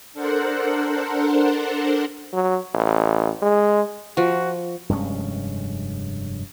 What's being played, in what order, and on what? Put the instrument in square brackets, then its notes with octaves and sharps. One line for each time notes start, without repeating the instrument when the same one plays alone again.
[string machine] D4 A4 A#4 C5 F#5
[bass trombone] F#3
A1
G#3
[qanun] F3 [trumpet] F#4
[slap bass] F1 G2 G#3 C#4